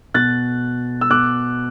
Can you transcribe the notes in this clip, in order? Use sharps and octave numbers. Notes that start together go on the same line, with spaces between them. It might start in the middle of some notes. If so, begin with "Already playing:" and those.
B2 F#6 A6
E6
B2 D6 F#6